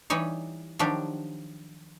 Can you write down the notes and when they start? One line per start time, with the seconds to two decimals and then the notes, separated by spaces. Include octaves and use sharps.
0.10 E3 G3 D#4 C#5
0.79 D#3 F3 F#3 D4 G4